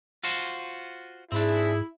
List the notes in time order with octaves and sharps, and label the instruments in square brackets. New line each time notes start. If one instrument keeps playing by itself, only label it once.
[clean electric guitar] F4 F#4 C5
[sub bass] G#2 [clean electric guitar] C4 D4 [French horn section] E4 [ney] G#4